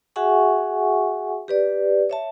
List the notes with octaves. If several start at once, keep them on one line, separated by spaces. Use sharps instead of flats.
F#4 G#4 E5 F#5 G#5 C#6
G4 B4 D5
C#5 E5 A5